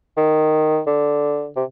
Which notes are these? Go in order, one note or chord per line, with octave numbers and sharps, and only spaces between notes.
D#3
D3
C3